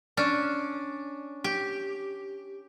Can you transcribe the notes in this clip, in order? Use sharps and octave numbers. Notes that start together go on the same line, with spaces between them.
C#4 D4
G4